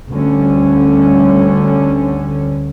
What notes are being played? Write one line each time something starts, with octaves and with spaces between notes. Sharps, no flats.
D2 D3 G3 C#4